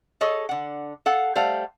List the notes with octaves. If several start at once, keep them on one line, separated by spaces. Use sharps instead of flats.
G#4 A4 C#5 D#5
D3 F#5
A4 F5 F#5
G3 A3 C5 F5 F#5